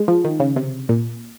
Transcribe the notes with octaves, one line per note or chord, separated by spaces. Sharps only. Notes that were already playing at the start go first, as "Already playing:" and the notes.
Already playing: G#3
F3
D#3
C#3
C3
A#2